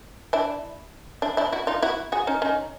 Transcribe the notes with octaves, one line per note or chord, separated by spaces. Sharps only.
D4 E4
D4 E4
D4 E4
E4 F#4
D#4 F4
E4 F#4
F#4 G#4
C#4 D#4
C#4 D#4